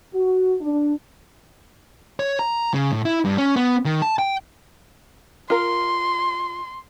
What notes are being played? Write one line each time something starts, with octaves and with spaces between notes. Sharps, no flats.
F#4
D4
C#5
A#5
C#3
A2
E4
G2
C#4
B3
D#3
A5
G5
F4 A#4 C6